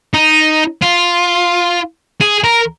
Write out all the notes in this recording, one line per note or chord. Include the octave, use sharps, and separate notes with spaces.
D#4
F4
G#4
A#4